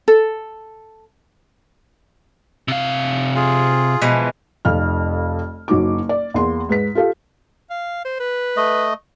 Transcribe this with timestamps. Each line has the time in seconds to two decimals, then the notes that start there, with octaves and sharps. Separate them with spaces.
0.08 A4
2.68 C3 F5
3.36 F4 G#4
4.02 B2 E3 F3 G#3
4.65 F1 F2 F5 F6
5.68 F#1 F#3 D#4 D6
6.09 D5
6.34 E2 A#3 C6
6.69 G#2 B4 B6
6.95 F4 G4 A4 F5
7.70 F5
8.05 C5
8.20 B4
8.57 A3 D#5